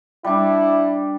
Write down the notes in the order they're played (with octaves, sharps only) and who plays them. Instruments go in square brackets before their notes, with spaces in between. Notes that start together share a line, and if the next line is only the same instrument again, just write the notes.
[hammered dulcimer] G3 D4 [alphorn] E4